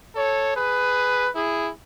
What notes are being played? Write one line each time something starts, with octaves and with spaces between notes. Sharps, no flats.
A4 C#5
G#4 B4
E4 G#4